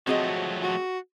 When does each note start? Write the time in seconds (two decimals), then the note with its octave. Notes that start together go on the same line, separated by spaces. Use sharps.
0.07 F3 F#3 A3 C4 F#4 G#4 D#5
0.63 F#4